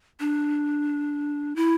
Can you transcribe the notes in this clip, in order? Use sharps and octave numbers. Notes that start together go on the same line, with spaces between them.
D4
E4